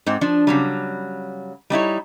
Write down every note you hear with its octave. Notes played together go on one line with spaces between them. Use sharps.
G#2 C4
F3 D4
C#3 F#3 G3
G3 D#4 E4 C#5